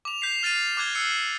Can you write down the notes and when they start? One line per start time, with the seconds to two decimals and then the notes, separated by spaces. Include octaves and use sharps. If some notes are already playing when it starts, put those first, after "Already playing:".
0.05 D6 F7
0.21 G6 B6 C7 F7
0.43 F6 A6 C7 D#7 F7
0.77 D6 F#6 G#6 G7
0.95 E6 F#6 C7 C#7